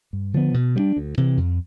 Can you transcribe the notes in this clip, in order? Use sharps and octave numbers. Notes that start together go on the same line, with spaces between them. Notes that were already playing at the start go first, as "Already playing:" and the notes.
G2
D3 F3 B3
B2
G3 B3 D4
D2
C3 E3
F2